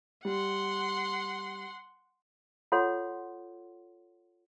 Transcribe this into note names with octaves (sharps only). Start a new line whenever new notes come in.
G3 F#5 C6
F4 A4 C#5 F#5 C6